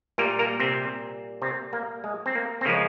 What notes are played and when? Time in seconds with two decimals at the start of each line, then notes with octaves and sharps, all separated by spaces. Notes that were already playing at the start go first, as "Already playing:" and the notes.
0.18 A#2 G3 A#3 A#4
0.39 A#3 A#4
0.60 C3 C4
1.42 C3 C4
1.73 A#3
2.04 G#3
2.26 C4
2.35 A#3
2.61 C4
2.65 C#3 F3 G#3 A#3